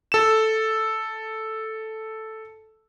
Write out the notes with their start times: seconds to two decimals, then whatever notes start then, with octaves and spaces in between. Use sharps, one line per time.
0.12 A4 E7